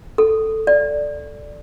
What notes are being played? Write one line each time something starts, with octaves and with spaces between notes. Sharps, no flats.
A4
D5